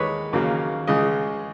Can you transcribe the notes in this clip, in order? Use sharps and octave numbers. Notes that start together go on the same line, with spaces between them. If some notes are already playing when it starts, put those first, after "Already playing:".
Already playing: D#2 D#3 G#3 B4 C#5
D#2 C#3 F#3 A#3
C#2 C#3 G#3 D#5